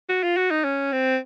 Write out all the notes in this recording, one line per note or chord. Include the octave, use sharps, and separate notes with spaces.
F#4
F4
F#4
D#4
C#4
C4